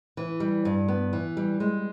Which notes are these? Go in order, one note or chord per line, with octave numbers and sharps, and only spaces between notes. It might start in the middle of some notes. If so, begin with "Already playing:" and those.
E3
G3
G2
B3
E3
G3
G#3